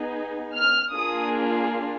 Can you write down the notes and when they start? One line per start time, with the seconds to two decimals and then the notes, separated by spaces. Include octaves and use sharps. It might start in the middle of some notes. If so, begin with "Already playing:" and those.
Already playing: B3 D#4 G#4
0.57 F6
0.94 A#3 D4 F4 G#4 D#6